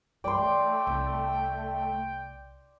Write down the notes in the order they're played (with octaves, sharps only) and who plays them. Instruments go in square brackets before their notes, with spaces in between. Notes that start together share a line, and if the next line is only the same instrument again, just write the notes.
[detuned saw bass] G2 [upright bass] E3 D#4 [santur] D5 C6 [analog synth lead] G5
[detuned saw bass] A3
[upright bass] C2